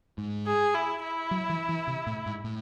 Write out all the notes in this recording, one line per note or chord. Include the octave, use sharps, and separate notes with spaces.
G#2
G#4
E4
E4
F#3
E3
E3
C3
A2
G#2
A2